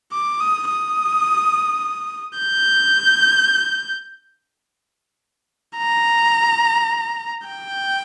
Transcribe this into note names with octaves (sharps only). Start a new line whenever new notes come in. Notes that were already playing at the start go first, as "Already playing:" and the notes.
D6
D#6
D#6
G6
A#5
G5